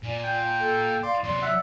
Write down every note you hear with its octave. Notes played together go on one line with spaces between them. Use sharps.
A#2 D5 G#5
G5
A4
D5 F5 C6 D6
C3 F#3 D5 C6
E5 F#5